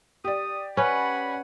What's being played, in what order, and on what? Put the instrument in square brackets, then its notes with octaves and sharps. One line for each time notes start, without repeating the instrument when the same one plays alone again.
[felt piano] G4 D5 [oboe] D#6
[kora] C#4 B4 [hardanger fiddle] F#5 G#5 [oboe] B5